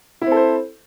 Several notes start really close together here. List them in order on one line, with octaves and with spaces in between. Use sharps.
E4 C4 A4 C5